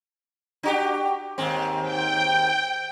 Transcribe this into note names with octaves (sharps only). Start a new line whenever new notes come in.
D4 F#4 G4
D#2 G#2 C4
G5